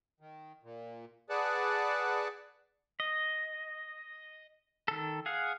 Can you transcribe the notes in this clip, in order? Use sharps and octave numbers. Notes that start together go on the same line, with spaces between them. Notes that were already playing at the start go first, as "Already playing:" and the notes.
D#3
A#2
G#4 B4 D5 F#5 A5
D#5
D#3 A4
G#4 F5 F#5